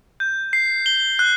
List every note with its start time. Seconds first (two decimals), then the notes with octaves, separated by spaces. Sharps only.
0.20 G6
0.53 C7
0.86 G7
1.19 F#6